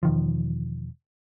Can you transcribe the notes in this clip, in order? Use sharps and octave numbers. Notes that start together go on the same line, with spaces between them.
E1 D#3 F3